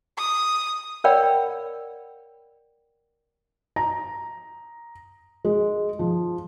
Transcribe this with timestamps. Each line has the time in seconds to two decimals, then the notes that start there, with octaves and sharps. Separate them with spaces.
0.17 D#6
1.04 A#4 C#5 D5 F#5 G5 B5
3.76 A#5
5.45 G#3
5.99 F3